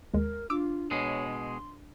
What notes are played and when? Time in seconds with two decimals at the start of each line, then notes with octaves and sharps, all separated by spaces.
0.14 D#2 G#3 A#4
0.50 D4 F4 D6 E6
0.91 B2 G#3 C#5
1.29 C6